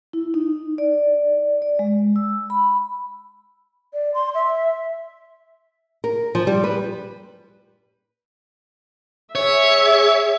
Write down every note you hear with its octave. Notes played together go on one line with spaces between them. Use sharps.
E4
D#4
D5
D5
G#3
E6
B5
D5
C6
E5
A#4
F3
G3
B4
G#4 C#5 E5